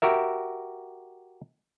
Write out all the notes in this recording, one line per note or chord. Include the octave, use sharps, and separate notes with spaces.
F#4 G4 A#4 E5